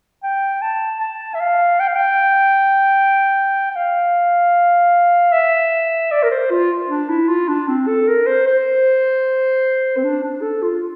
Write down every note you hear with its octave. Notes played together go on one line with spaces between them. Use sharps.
G5
A5
A5
E5
F5
G5
F5
G5
G5
F5
E5
D5
A#4
C5
F4
D4
E4
F4
D4
C4
A4
A#4
C5
C5
C4
D4
D4
A4
F4